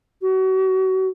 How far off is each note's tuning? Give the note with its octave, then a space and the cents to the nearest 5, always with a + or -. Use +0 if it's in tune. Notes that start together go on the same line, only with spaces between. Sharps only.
F#4 +35